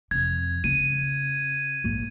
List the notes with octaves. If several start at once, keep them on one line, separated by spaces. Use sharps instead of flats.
F2 C3 G#6
C#3 D#7
A#1 G#2